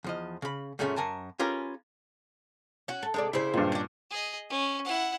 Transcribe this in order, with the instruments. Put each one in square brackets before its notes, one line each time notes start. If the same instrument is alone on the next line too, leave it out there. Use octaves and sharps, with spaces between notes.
[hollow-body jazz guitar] E2 F3 D#5
C#3 B5
F#2 A#2 G#3 A3 C4 C#4
F#2 A#4 G#5 A5
C#4 F4 G4 G#4 A#4 B4
[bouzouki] C#4 F#4
[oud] A4
[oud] C3 A4 D5 [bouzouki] G#3
[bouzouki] C#3 C5 [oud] E4 G#4 D5
[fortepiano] G2 A#2 [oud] D#3
[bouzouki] C#4 D4
[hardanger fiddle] G#4 D#5
C#4
E4 F#5